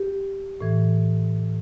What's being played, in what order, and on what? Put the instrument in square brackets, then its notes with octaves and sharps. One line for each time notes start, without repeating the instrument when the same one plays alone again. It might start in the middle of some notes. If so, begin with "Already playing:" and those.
Already playing: [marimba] G4
A2 E3